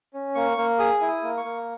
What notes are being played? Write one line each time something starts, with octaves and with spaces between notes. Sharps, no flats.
C#4
A#3 C#6
A#3
G#4 D#6
E4
D#6
A#3
C#6
A#3